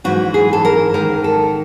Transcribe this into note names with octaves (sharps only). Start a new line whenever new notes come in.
G#2 E3 F#4
G#4
A4
A#4
G#2 D#3 A#4
A4